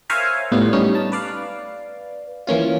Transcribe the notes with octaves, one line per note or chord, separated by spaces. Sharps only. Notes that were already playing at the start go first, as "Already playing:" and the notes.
A#4 C5 C#5 E5 F5 G#5
A2 G3 B3 F4
G3 C#4 D#4
A5
B4 D5 F5
E3 A#3 C#4 F4